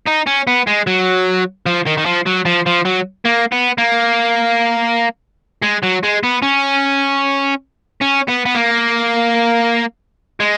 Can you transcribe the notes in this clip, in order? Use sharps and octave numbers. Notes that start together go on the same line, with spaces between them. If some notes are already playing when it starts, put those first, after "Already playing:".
D#4
C#4
B3
G#3
F#3
F3
D#3
D#3
F3
F#3
F3
F3
F#3
A#3
B3
A#3
G#3
F#3
G#3
B3
C#4
C#4
B3
B3
A#3
G#3